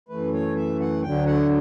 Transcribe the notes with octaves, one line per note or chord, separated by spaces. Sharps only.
F#2 E3 A3 B4
C#5
E5
F#5
D2 D3 F#3 G5
F#5